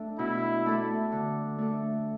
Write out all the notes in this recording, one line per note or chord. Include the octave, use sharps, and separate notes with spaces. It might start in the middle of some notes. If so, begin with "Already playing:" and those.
Already playing: A3 D4 A4
B2 E4
A3 D4 A4
D3
A3 D4 A4